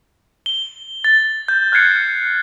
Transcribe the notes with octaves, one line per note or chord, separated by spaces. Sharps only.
G7
A6
G6
F6 F#6 G#6 C7 C#7